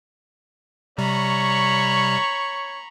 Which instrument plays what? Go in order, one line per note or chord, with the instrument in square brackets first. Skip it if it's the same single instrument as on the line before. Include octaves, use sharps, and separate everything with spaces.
[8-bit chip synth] C3 G3 [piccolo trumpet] C#5 [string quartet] A#5 B5 C#6